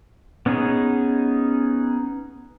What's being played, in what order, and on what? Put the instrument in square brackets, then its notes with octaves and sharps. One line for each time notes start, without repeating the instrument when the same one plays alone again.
[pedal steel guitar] B3 C#4 D#4 G#4